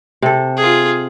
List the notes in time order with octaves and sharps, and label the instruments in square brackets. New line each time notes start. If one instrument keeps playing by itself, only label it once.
[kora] C3 A4
[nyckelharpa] F4 G#4